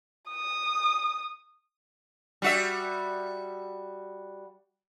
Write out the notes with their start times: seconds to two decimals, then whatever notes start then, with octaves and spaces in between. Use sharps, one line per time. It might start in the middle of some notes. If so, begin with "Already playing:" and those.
0.30 D#6
2.42 G3 F#4 E5